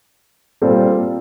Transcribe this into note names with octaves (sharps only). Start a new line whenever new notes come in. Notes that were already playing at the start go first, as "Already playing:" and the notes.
A#2 G3 C4 F4 A4